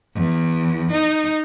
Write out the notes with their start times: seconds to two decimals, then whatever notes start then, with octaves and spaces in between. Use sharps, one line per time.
0.15 E2
0.91 D#4